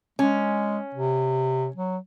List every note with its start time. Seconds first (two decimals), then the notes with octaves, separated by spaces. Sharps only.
0.19 G#3 C#4
0.94 C3
1.76 F#3